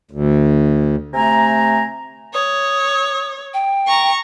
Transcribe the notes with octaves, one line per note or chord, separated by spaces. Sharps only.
D2
C3 A3 G#5 A#5
C#5 D#6
G5
A#5 C#6